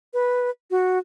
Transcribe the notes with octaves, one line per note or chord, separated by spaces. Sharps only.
B4
F#4